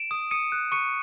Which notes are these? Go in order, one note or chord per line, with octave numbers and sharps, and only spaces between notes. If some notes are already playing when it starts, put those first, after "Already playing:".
Already playing: D7 E7
D#6
D#6 C#7 D#7
F#6
C#6 C#7 D#7